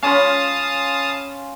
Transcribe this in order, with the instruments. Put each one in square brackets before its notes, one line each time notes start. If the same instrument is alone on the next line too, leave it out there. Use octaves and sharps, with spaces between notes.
[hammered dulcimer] C#4 F4 B5 [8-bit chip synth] F5 A5 D#6